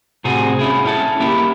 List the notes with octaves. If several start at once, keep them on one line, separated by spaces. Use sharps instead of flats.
A2 C3 C4 F#4 G#4
C#4 E4 G#4
C#4 E4 A4
A#3 C#4 E4 G4